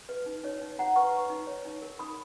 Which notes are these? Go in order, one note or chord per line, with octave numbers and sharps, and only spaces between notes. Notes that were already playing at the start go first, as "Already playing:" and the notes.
B4
D#4
D#4 C#5
D#4
D#4 F#5 A#5
B4 A#5 C#6
B4
D#4
C#5
D#4
A#4
D#4 B5 D#6